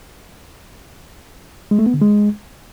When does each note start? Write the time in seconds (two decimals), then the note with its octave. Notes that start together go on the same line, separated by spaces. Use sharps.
1.71 G#3
1.79 A3
1.86 B3
1.94 D3
2.01 G#3